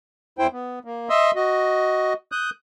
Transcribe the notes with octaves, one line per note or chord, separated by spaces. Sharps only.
E2 E4 C5 G5
B3
A#3
D#5 E5 C6 D#6 E6
F#4 D#5
D#6 F#6 G6